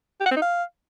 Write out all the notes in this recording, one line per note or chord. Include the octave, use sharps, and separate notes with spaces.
G4
F#5
C4
D#4
F5